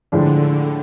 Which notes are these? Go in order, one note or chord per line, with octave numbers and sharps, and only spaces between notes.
A2 D3 F3 G#3 D4